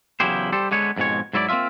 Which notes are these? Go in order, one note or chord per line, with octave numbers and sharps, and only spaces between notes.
E2 C#3 F#3 E4 G4 C5
G3 G4 A4 C5
D3 G#3 B3 C#5
F2 G#2 B2 G#3 C#5
G#2 F#3 E4 A4 D5
A#3 C4 C#4 F4 E5